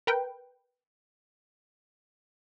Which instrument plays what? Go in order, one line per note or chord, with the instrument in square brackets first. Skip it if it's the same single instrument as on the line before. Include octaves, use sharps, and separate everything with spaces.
[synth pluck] A#4 B4 G5